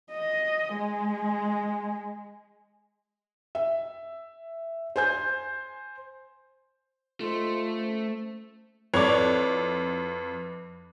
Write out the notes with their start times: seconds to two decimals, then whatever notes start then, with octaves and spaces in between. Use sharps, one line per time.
0.12 D#5
0.75 G#3
3.55 E5
4.96 C5 G#5 G6
7.21 A3 F4 C5 D#5 C6
7.76 C#4 C5
8.94 F2 E4 A4 B4 C#5 D5 D6